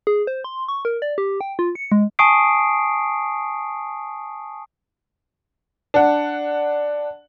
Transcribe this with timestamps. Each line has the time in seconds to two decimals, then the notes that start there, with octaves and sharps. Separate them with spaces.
0.07 G#4
0.27 C5
0.44 C6
0.68 C#6
0.85 A#4
1.02 D5
1.18 G4
1.41 G5
1.59 F4
1.75 C#7
1.92 G#3
2.19 G#5 A5 C#6 D#6 C7 D7
5.94 D4 F#5